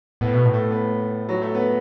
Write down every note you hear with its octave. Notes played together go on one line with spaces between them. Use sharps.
A2 B3
B2 B3
A2
A3
B3
F#3
A3
B3